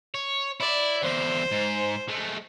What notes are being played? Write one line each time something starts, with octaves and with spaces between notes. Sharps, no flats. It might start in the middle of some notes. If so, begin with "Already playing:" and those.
C#5
E4 D5
E2 D3 C5
G#2
G#3 A3